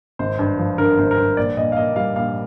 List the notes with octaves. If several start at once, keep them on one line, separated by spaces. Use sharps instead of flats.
G#1 C5
G2
F3
D3 A#4
G#1 C5
A#4
G2 C5
A#1 D5
A#2 D#5
F5
A#3 D#5
G3 F5
A#1 F5